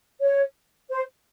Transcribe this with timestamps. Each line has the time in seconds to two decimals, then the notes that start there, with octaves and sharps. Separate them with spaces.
0.20 C#5
0.90 C5